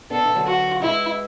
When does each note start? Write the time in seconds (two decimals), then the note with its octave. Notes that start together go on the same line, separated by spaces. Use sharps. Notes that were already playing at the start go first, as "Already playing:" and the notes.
0.10 B3 D4 A4
0.25 E3
0.35 D3 F#3
0.47 F#4
0.82 E3 G#3 E4